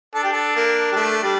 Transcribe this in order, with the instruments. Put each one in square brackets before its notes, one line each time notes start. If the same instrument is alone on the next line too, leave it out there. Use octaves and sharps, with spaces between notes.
[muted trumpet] D4 [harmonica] A4
[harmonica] G4
A4
A#3
G3
A3
G3